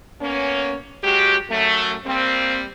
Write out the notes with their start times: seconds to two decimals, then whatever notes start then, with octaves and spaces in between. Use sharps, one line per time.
0.20 A#3 B3 C#4
1.03 F#3 G#3 F#4 G4
1.50 F#2 F#3 A3
2.05 G3 A#3 C4